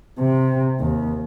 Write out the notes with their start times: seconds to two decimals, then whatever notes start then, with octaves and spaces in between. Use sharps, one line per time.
0.19 C3
0.80 D#2